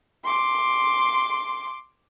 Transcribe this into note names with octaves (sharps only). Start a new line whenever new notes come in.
C6 D6